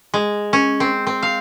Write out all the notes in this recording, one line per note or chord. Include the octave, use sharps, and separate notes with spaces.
G#3
C#4
C4
C4
F5